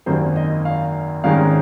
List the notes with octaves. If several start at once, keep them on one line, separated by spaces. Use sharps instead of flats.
G#1 F#2 D#3 A#3 C5
D#5
F5
G#1 G#2 D#3 G#3 C#4 F5